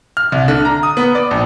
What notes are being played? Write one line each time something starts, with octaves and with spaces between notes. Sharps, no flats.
F6
C2
D3
A#5
D#6
B3
D5
A#1